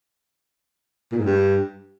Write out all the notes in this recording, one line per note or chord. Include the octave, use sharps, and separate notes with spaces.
A#2
G#2
G2